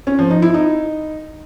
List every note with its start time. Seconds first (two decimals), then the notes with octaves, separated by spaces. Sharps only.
0.07 C#4
0.19 F3
0.31 D#4
0.42 E4
0.54 D#4